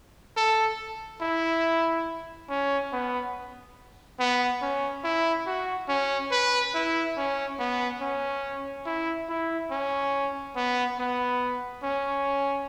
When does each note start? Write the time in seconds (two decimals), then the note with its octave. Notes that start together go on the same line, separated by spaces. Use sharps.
0.37 A4
1.21 E4
2.50 C#4
2.92 B3
4.19 B3
4.62 C#4
5.04 E4
5.46 F#4
5.89 C#4
6.31 B4
6.74 E4
7.17 C#4
7.59 B3
8.01 C#4
8.86 E4
9.29 E4
9.71 C#4
10.56 B3
10.99 B3
11.83 C#4